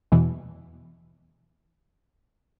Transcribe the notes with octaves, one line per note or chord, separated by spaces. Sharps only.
E2 B2 E3